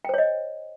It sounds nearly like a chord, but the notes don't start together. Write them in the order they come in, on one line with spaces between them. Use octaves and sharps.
G5 C5 C#5 D#5